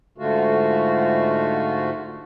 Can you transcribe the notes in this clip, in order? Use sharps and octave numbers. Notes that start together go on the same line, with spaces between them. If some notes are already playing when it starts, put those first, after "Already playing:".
G#2 D3 A3 F4 F#4